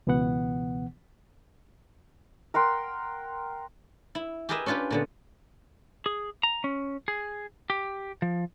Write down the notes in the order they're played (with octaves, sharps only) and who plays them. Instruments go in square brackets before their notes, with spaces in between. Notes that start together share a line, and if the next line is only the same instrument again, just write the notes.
[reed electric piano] C#2 B2 E3 B3 F#5
[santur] A#4 F#5 G5 C6
[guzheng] E4
G4 G#4 A#4 B4 D#5 E5
C#4 D4 F4 G4 B4
A#2 D3 B3
[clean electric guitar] G#4
A#5
C#4
G#4
G4
F3